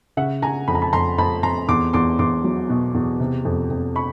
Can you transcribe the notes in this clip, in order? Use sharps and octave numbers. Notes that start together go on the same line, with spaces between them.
C#3 E5 F#5
C#3 G#5 A#5
F2 B5
A#5
A5 B5
F2 A#5 C6
F2 A5 B5
F2 A#5 C6
E2 C6 D6
E2 C6 D6
E2 C6 D6
F#3
B2
E2
C3
F2
F2
B5 C#6